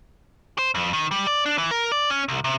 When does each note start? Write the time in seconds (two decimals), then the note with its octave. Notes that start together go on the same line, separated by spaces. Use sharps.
0.59 C5
0.75 F2
0.93 D#3
1.11 G3
1.27 D5
1.46 D4
1.58 E3
1.71 A#4
1.92 D5
2.10 C#4
2.29 C2
2.44 C3